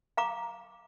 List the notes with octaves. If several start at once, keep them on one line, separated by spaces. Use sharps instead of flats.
F5 A#5 D6